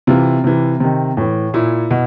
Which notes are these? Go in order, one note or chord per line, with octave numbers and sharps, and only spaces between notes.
C3 E3 F4
C3 E3
C3 D#3
A2 E3
A#2 E4
B2